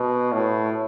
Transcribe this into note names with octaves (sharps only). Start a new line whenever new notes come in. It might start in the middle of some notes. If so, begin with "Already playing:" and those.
Already playing: B2
A2